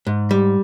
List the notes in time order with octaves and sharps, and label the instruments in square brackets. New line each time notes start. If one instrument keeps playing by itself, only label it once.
[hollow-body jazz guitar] G#2
G3